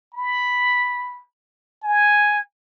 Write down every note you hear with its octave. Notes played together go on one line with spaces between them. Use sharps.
B5
G#5